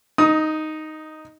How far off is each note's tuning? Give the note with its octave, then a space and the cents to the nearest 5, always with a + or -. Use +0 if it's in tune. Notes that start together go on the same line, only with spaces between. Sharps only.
D#4 +0 D#6 +20